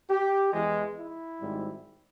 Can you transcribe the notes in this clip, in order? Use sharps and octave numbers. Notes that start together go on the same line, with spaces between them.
G4
E2 E3 G#3
E4
G#1 G#2 G3 C4